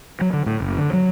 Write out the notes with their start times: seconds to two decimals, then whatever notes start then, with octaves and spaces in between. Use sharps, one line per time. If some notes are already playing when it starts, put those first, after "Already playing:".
0.21 F#3
0.33 D3
0.46 A2
0.60 F#1
0.78 D3
0.93 F#3